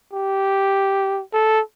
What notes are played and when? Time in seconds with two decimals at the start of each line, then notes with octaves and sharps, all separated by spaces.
0.13 G4
1.33 A4